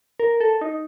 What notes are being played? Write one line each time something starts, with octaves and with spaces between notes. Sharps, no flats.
A#4
A4
D#4